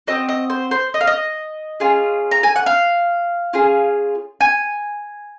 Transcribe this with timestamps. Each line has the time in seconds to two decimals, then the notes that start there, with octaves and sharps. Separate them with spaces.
0.07 C4 F#4 D#5
0.29 D#5
0.50 C5
0.71 C5
0.94 D#5
1.01 F5
1.07 D#5
1.80 C#4 F4 G#4
2.31 A#5
2.43 G#5
2.56 F#5
2.66 F5
3.53 C#4 F4 G#4
4.41 G#5